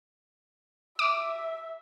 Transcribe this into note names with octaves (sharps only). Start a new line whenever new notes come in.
E5 D6